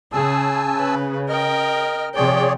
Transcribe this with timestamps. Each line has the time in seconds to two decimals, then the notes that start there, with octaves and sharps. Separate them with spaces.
0.13 C#3 G#4 G#5 A5 E6
0.78 B4
1.29 A#4 D#5 G5 F6
2.15 C3 F3 G#4 C#5 D5 G5